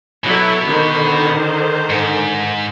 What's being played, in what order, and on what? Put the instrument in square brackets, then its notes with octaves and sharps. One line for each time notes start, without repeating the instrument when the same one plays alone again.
[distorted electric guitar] B2 [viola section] F#3 E4 A4
[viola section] D3 D#3 C5
[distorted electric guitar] G#2